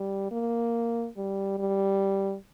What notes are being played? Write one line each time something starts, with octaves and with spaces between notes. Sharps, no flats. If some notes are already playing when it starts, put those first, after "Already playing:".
Already playing: G3
A#3
G3
G3